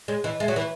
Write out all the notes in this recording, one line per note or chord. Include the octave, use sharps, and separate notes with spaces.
G#3 C#5
E3 D#5
G#3 E5
F#3
E3